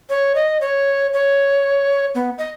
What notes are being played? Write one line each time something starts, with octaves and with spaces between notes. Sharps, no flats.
C#5
D#5
C#5
C#5
B3
D#5